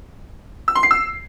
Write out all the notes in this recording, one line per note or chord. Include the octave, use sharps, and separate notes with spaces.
E6
C6
C7
E6